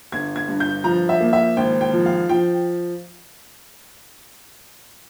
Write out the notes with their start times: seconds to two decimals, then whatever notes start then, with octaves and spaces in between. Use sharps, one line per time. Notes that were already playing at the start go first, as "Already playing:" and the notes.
0.12 G1 G#6
0.36 G#6
0.48 G2
0.60 G6
0.84 F3 A#5
1.09 E5
1.20 A#3
1.33 E5
1.57 G#1 G5
1.81 G5
1.93 F3
2.06 F5
2.29 F3 G5